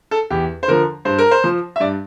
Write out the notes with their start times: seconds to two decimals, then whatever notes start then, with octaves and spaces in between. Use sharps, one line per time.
0.11 A4
0.30 E2 G4
0.63 C5
0.68 D3 F3 A#4
1.05 G2 C5
1.18 A#4
1.31 C5
1.44 F3
1.76 E5
1.80 G2 D5